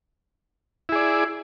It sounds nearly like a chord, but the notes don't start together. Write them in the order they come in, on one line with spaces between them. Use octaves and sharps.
E4 G#4 D5